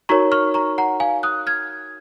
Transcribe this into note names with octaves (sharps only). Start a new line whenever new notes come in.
D#4 F#4 A#4 C#5 A#5 C#6
C#6 F6
A#5 C#6
F#5 A#5
F5 G#5
D#6 F#6
F6 G#6